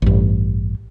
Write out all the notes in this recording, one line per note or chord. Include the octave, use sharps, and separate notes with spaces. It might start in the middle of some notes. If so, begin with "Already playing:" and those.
A1 G2